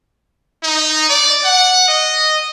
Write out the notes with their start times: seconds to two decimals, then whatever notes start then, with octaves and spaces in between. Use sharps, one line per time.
0.63 D#4
1.09 D5
1.44 F#5
1.88 D#5